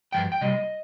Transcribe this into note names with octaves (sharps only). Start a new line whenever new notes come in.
G2 F3 G5
G5
C3 G3 D#5